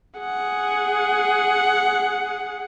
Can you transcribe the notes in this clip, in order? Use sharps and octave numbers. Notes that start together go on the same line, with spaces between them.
G#4 F#5